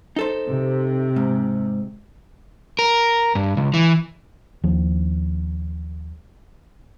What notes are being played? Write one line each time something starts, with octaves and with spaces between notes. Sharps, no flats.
D#4 A4 C5
C3
G#2
A#4
G2
C#2
E3
D#2 F3